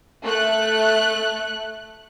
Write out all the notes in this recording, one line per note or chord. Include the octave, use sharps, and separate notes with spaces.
A3 F#6